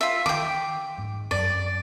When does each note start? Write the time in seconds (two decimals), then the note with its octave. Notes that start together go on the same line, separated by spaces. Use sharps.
0.01 F4 E5
0.26 D#3 G5 D6
0.98 G#2
1.31 F#2 D5